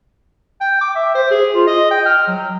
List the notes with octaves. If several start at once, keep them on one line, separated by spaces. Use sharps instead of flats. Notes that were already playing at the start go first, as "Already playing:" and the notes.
G5
D6
E5
C5
G#4
F4
D#5
G5
F6
F#3